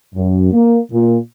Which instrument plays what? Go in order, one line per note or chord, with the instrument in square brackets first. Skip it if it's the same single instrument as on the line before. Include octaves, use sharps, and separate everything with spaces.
[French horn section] F#2
A#3
A#2